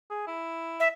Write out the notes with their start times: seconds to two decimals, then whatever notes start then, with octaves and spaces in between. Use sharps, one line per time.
0.10 G#4
0.27 E4
0.80 E5